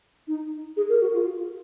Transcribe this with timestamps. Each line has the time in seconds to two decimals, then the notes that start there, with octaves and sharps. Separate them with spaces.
0.28 D#4
0.77 G#4
0.89 A#4
1.01 F#4
1.14 F4